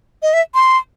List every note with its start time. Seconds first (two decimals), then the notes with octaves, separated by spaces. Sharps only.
0.22 D#5
0.33 E5
0.55 C6